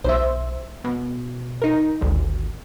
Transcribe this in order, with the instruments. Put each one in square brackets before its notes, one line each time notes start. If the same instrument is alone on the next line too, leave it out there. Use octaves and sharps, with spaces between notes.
[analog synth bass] B1 [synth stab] C5 E5
[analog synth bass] B2
[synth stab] D#4 A#4
[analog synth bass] G#1 [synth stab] D2